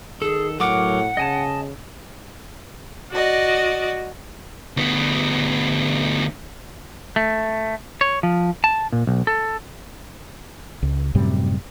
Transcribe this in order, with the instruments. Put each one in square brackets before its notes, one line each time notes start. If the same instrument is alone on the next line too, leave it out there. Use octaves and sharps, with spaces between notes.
[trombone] D#3 [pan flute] G#4 [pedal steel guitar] A4
[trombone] A2 [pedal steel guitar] F#3 A#4 D6 [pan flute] F#5
[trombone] C#3 [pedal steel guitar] D#5 G#5 A5
[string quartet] F#4 D5 D#5
[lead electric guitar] D2 B3
[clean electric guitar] A3
C#5
F3
A5
A#2
B1
A4
[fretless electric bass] C#2
F#2 A2 C3 G3